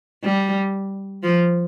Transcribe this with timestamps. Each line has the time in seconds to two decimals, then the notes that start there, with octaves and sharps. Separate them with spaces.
0.24 G3
1.23 F3